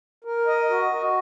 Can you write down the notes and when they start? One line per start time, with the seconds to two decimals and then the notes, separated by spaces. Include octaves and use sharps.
0.25 A#4
0.47 D#5
0.70 F#4
0.91 F#4